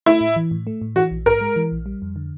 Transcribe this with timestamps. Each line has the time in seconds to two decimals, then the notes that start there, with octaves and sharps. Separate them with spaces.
0.06 A3 E4
0.21 A2
0.36 E3
0.51 A2
0.67 A3
0.82 A2
0.96 E3 F#4
1.11 A#1
1.26 G#2 A#4
1.41 G#3
1.56 E3
1.72 A#1
1.86 G3
2.02 F2
2.16 D3